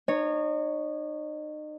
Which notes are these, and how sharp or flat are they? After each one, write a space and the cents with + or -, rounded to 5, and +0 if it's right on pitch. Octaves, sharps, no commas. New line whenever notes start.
D#4 -35 C#5 -5